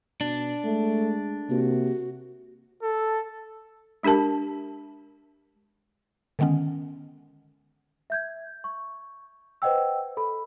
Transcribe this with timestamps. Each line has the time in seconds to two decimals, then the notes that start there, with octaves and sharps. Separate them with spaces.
0.21 B2 D4
0.65 G#3 A3
1.50 C3 A#3 F#4
2.83 A4
4.03 G#3 D4 G4 A#4 A5
6.39 D3 D#3 G#3 B3 C#4
8.10 E5 G6 G#6
8.64 C#6
9.62 B4 C5 D#5 F#5 G5 E6
10.17 A4 B5